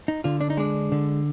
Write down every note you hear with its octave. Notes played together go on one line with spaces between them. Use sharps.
D#4
D3 F4
D4
D#4
G#3 D4
D3